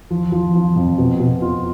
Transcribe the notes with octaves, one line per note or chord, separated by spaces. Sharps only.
F3
F3
F3
F2
B2
B2
F4